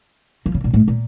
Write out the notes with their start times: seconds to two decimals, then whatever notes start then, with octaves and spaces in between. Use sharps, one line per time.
0.46 F3
0.54 C#3
0.64 A#2
0.74 A2
0.88 A#2